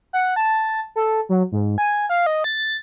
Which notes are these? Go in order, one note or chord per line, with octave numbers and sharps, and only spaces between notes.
F#5
A5
A4
F#3
G#2
G#5
F5
D#5
A6